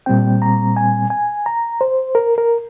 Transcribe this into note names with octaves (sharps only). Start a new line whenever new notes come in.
A#2 G3 C4 G5
A#5
G#5
G#5
A#5
C5
A#4
A#4